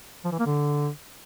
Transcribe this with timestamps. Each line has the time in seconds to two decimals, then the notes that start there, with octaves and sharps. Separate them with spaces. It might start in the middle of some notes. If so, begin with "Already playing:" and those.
0.25 F3
0.32 E3
0.39 A#3
0.46 D3